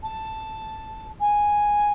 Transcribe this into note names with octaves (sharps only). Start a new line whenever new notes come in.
A5
G#5